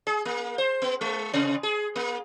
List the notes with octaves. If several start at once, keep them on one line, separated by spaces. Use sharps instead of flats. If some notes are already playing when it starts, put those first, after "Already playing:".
G#4
A#3
C5
B3
G#3
C3
G#4
A#3